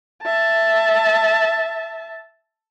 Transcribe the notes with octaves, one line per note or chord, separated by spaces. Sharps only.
E5 A5